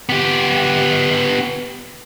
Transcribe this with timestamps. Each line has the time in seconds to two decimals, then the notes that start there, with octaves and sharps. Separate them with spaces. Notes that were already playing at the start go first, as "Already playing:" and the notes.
0.09 B3 G4